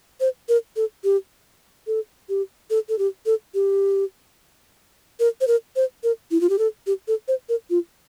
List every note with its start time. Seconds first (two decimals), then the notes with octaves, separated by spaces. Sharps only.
0.20 C5
0.49 A#4
0.76 A4
1.04 G4
1.87 A4
2.29 G4
2.70 A4
2.89 A4
2.98 G4
3.26 A4
3.54 G4
5.20 A#4
5.41 C5
5.47 A#4
5.76 C5
6.03 A#4
6.31 E4
6.41 F4
6.49 G4
6.59 A4
6.87 G4
7.08 A4
7.28 C5
7.49 A#4
7.70 F4